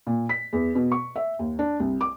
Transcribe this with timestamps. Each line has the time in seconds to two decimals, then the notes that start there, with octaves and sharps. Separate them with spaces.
0.07 A#2
0.29 B6
0.53 E2
0.75 B2
0.92 C#6
1.16 E5
1.39 D#2
1.59 D4
1.80 C2
2.01 D6